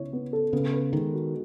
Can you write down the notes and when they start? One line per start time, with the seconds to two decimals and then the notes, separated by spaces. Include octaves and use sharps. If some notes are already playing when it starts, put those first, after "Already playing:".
Already playing: C#3 B3 E4 C#5
0.13 B3
0.33 A4
0.53 C#3 B3
0.73 B4
0.92 D#3 G#3
1.14 F#4